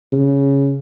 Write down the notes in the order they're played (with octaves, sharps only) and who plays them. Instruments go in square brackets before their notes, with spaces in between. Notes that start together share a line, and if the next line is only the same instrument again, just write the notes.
[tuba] C#3